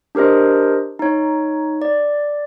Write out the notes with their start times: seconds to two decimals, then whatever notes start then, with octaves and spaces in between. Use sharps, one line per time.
0.15 D4 G4 A#4 C5 D#5
0.99 D#4 C#5
1.82 D5